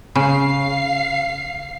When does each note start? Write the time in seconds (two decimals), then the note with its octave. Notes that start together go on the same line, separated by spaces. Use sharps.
0.16 C#3 F5 C7